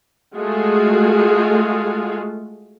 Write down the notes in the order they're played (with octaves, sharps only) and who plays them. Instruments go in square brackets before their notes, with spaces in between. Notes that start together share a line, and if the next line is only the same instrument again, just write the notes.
[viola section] G#3 A3 F4 F#4 G#4